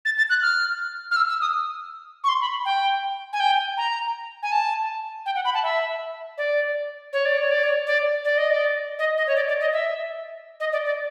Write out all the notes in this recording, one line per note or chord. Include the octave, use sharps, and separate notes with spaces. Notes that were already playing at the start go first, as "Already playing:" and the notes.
A6
A6
F#6
F6
F6
E6
E6
D#6
C#6
C6
B5
G5
G#5
G5
A#5
G#5
A5
G5
F#5
B5
A5
E5
D5
C#5
D5
C#5
D5
C#5
D5
D5
D#5
D5
D#5
D#5
C#5
D5
D5
D#5
E5
D#5
D5
D5